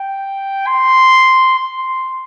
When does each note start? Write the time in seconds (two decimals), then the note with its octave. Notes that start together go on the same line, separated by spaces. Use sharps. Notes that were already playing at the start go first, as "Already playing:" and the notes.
Already playing: G5
0.67 C6
1.59 C6